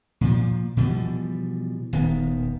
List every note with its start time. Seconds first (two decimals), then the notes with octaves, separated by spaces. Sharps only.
0.21 A#2 F3
0.77 B2 E3 F3 G3
1.93 D#1 D#3 B3